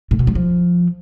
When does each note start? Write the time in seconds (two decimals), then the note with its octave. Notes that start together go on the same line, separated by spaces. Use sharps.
0.11 A2
0.19 B2
0.27 G3
0.35 F3